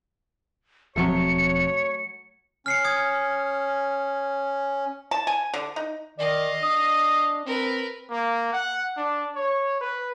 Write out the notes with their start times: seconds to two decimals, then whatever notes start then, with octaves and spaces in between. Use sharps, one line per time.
0.96 E1 F3 F#3 A3 C4 C#5 C#7
2.66 C#4 F6 C7 C#7
2.84 D#6 G#6
5.11 A5
5.27 G#5
5.54 D3
5.76 D#4
6.19 D#3 D5 D#5 F5
6.62 D4 D#6
7.46 C4 A#4 B4
8.11 A#3
8.53 F#5
8.97 D4
9.36 C#5
9.81 B4